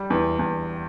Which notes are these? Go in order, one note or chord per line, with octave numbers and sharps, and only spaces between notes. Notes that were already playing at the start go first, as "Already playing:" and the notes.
Already playing: G3
E2
E2